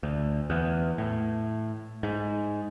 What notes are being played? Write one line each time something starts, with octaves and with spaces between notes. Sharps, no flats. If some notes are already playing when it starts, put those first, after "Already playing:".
D2
E2
A2
G#2